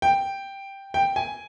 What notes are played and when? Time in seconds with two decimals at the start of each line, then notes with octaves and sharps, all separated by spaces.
0.02 G5
0.94 G5
1.16 G#5